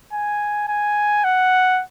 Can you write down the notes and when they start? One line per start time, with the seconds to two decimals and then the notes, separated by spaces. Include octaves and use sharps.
0.13 G#5
0.68 G#5
1.24 F#5